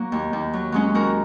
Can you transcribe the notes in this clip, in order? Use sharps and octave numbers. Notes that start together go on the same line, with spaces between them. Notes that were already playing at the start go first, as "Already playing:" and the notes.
Already playing: F#3 A#3 F#4
D#2
D#2
F#3
F#3 G#3 C#4
D#2 F#4 A#4